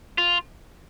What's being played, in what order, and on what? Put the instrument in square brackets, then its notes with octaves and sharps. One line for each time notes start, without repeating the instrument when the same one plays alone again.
[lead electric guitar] F4